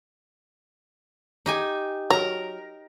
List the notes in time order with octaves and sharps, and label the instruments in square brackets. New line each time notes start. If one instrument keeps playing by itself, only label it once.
[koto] D#4 G4 G#5
[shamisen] F#3 [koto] A#4 A#5